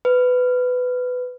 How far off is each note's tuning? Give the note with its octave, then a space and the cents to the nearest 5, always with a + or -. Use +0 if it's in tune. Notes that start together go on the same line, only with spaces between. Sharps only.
B4 +15